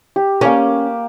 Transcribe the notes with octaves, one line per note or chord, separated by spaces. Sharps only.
G4
A#3 C#4 D6